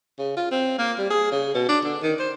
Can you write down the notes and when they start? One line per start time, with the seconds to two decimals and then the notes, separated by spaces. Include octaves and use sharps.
0.18 C#3
0.36 F4
0.51 C4
0.78 A#3
0.98 G3
1.10 G#4
1.31 C#3
1.54 B2
1.69 D4
1.85 D3
2.02 D#3
2.19 C5